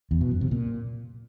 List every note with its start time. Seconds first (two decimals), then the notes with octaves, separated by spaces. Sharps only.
0.11 E2
0.21 B2
0.31 F#2
0.41 C3
0.51 A#2